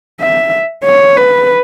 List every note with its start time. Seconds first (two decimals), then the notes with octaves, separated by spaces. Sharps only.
0.21 E5
0.84 C#5
1.17 B4